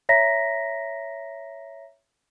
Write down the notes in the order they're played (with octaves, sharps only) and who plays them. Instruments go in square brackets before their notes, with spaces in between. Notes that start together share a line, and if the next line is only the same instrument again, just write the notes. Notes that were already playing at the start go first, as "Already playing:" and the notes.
[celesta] C#5 E5 A#5 A#6 B6